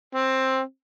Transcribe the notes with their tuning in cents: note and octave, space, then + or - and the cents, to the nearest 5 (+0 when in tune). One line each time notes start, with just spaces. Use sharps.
C4 +10